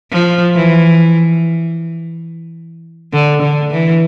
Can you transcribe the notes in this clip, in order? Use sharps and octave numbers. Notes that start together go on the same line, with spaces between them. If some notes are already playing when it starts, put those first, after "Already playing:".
F3
E3
D3
D3
E3